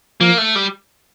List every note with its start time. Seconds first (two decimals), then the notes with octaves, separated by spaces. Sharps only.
0.21 F3 A#3
0.38 A3
0.55 G3